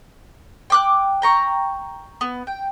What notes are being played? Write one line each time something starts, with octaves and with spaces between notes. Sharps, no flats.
G5 D6 F#6
G5 A#5 C#6
B3
G5